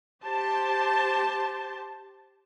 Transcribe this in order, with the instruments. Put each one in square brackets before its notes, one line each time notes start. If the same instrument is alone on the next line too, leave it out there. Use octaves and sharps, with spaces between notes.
[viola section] G4 C5 A5